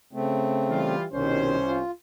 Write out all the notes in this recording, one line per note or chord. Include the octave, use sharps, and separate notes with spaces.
C#3 A3 C4
E3 G3 F4
C2 B2 D#3 C#4 C5
F4